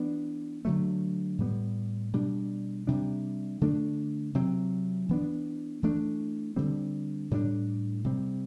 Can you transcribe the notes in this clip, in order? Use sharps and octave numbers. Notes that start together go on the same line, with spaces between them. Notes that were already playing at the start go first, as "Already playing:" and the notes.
Already playing: E3 B3 D4
D3 F#3 A3
A2 G3 B3
B2 G3 D4
C3 G3 D4
D3 A3 D4
C3 F#3 C4
E3 B3 D4
E3 A3 D4
D3 G3 C4
A2 G3 B3 D4
C3 G3 C4